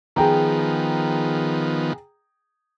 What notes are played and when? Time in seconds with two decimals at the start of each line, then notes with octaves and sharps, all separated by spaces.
0.16 D#3 F3 B3 G#4 G5 A#5